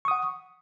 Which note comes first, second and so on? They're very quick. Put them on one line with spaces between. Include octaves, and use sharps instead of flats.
C#6 D#6 F#5